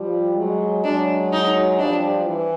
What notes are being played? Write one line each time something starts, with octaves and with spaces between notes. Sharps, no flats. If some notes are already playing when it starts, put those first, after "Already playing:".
Already playing: F3 G3
F#3 G#3
F#3 G#3 D4
D#4
F3 G3 D4
E3